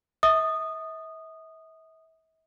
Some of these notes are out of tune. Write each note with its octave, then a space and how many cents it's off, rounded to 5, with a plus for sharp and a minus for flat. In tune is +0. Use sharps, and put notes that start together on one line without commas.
E5 -40 D#6 -15